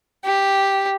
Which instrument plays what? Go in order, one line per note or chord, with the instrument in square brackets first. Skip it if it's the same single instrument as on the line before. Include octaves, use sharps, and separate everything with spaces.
[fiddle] G4